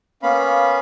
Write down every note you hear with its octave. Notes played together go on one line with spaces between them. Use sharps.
A#3 B3 C#4 F5 B5